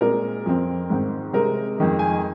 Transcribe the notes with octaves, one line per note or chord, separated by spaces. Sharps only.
A#2 G#3 C4 A#4
F2 F3 C4
G#2 D#3 C4
C3 G#3 C4 A#4
F2 D#3 G#3
G#5